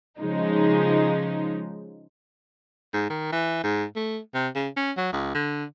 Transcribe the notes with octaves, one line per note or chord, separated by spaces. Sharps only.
C#3 F3 G#3 D#4
G#2
D#3
E3
G#2
A3
C3
C#3
C#4
F#3
C#2
D3